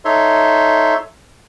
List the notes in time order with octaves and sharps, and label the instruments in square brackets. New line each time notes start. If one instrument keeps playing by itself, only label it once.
[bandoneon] D#4 A4 C#5 E5 C6